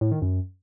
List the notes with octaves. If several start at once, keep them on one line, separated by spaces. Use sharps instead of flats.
A2
D#3
F#2